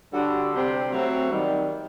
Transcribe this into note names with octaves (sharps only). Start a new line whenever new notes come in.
D3 G3 D4 F#4 A4
C3 G3 C4
F#3 A3 C4
D#3 G3